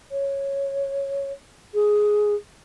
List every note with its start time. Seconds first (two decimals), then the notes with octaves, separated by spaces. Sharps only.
0.11 C#5
1.74 G#4